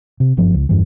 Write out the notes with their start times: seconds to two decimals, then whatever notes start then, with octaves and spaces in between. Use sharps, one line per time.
0.20 C3
0.37 F#1 G2 F3
0.54 C#2
0.69 E2 G2 E3